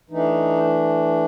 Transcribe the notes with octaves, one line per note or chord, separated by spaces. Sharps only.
E3 A3 D4 D#4